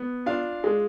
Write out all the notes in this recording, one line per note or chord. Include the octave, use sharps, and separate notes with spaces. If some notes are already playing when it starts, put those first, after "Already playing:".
Already playing: B3
D4 F4 F5
G#3